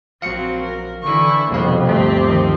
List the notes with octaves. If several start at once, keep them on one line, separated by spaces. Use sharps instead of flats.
A#1 F#3 C4 F5 C#7
A#4
D3 E3 E4 C#6
C2 F2 B2 A#3 B3 F5
D2 G2 A3 C4 G4
D#3 F3